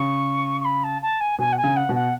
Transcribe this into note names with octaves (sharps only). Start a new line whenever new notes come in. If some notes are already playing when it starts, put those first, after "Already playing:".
Already playing: C#3 C#6
C#6
B5
A5
A5
G#5
B2 G#5
F#5
G#5
C#3
F#5
B2
F#5